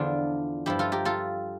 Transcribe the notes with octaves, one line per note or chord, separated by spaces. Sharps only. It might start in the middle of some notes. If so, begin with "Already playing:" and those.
Already playing: E2 D3 F3 D4 F4
G2 F3 E4 G4
F4 A4
G4 A#4
F4 A4